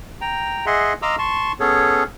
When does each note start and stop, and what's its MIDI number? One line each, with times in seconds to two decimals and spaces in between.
0.21 0.66 79
0.21 0.66 82
0.66 0.93 68
0.66 0.93 75
0.66 0.93 76
0.66 0.93 78
0.66 0.93 84
1.02 1.16 75
1.02 1.16 77
1.02 1.16 82
1.02 1.16 84
1.02 1.16 86
1.02 1.16 88
1.18 1.52 81
1.18 1.52 84
1.18 1.52 85
1.60 2.04 59
1.60 2.04 61
1.60 2.04 68
1.60 2.04 69
1.60 2.04 73